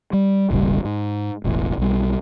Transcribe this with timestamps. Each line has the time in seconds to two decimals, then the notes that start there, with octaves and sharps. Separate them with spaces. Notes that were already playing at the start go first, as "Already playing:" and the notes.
0.13 G3
0.51 D#1 G#1 C#3 G3
0.85 G#2
1.44 E1 A1 G#2 E3
1.78 B1 G3